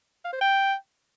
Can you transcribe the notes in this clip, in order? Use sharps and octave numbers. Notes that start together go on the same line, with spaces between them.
F5
C5
G5